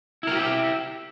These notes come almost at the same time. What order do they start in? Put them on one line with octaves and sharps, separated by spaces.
E4 A#4 F#4 G4 E5